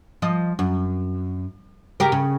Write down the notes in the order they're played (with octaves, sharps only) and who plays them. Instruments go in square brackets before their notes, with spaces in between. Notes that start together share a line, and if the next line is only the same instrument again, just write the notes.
[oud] F3 D#5
F#2
C#3 G4 A#4
C#3